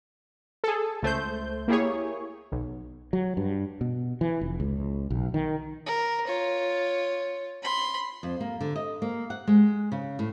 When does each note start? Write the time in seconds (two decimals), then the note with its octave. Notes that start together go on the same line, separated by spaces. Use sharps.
0.64 G#4 A4
1.02 C#2 A3 C5 G6
1.68 A#3 E4 G4 G#4 C#5
2.52 B1
3.13 F#3
3.37 G2
3.81 B2
4.21 E3
4.41 F1
4.60 C#2
5.10 B1
5.34 D#3
5.86 A#4
6.27 F4 C#5
7.62 B5 C6
8.23 F2
8.40 A#3
8.61 D3
8.76 D#5
9.02 A#3
9.30 F#5
9.47 G#3
9.92 C#3
10.19 A2